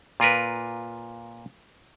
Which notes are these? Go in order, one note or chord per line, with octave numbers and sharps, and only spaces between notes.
A#2 F4 A#4 B4